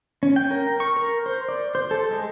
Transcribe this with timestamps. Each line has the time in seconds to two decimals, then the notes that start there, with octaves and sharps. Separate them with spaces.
0.23 C#4
0.36 G5
0.51 A#4
0.80 C#6
0.97 A#4
1.26 C5
1.49 D5
1.75 C5
1.91 A4
2.11 G#3